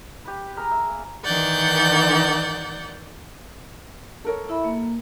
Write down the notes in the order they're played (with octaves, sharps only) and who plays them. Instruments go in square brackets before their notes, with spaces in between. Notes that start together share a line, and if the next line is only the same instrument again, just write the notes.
[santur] G4 B4
G#4 A#4 A#5
E5
A#3
[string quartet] D#3 E3 D5 F#5 G6
[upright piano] A4 A#4 C#5
[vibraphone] E4 E5 B5
A#3